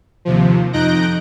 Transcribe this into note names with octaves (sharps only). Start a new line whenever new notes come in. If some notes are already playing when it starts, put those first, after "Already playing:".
D#2 C3 F3
F2 D#4 F#6 G6 A#6 D7